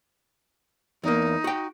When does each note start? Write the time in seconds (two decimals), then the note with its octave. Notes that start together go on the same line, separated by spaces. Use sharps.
1.04 E2 A#3 D#4
1.44 F#4 G5